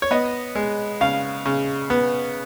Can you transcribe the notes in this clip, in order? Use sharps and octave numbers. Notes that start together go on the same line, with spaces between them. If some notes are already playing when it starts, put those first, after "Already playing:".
C#5
B3 D#5
G#3
C#3 F5
C#3
B3